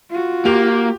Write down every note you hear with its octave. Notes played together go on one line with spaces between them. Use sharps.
F4 F#4
A#3 G4 F7